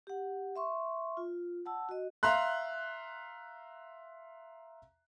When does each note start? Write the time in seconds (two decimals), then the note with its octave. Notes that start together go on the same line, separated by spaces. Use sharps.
0.07 G4 F#5
0.56 E5 C6 C#6
1.17 F4
1.66 F#5 A5 E6
1.89 F#4 D#5
2.23 E5 F5 A#5 C6 F#6